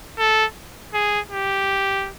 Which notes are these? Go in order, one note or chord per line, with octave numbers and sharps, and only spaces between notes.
A4
G#4
G4